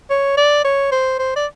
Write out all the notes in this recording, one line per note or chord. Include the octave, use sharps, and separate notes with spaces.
C#5
D5
C#5
C5
C5
D5